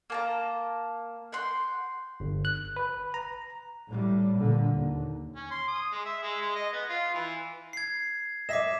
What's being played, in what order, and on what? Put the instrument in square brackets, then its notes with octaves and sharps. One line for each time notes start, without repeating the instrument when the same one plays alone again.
[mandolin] A#3 A5 A#5
F#5 G5 C6
[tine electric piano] G1
F#6
B4
A#5
[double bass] A2 G3
A#2 D3
D#2
[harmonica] C#4
C6
D#6
G#3
E5
G#3
G#3
D#5
B3
F4
E3
[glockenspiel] G#6 C7
[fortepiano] D#5 E5 [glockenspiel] D6 B6 E7